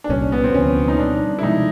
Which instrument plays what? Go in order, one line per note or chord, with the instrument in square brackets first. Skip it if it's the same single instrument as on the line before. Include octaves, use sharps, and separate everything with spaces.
[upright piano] D4
[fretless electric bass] C2 A#2 G3 [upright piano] C#4
[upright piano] B3
C4
[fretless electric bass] D2 D3 F3 [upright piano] C#4
[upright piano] D#4
[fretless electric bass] B2 G3 C4 [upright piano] D4
[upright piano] E4
[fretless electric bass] C3 F3 G#3 [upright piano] D#4